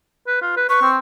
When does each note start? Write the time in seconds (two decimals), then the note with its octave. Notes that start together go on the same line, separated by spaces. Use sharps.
0.27 B4
0.42 F4
0.57 B4
0.69 B4 C#6
0.82 C4